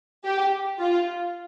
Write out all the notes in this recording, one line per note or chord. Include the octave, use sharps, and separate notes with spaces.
G4
F4